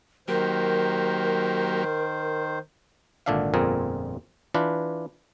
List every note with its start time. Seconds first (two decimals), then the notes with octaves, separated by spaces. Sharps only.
0.28 D#3 F#3 A#3 G4 A#4 C5
3.26 G#1 A#2 D3 D4 E5 F5
3.54 G1 F2 A#2 C4 G#4 A#4
4.54 E3 D4 F4 B4